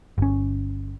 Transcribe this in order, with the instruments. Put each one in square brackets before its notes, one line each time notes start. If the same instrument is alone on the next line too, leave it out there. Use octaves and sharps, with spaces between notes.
[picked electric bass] G1 C#4